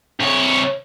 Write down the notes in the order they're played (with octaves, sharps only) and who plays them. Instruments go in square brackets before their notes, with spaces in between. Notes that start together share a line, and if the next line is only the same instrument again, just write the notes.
[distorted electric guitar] C3 C#5